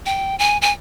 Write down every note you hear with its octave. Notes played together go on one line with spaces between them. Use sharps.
G5
G#5
G#5